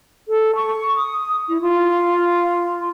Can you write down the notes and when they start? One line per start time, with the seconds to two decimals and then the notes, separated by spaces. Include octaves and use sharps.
0.28 A4
0.56 C#6
0.97 D#6
1.49 E4
1.62 F4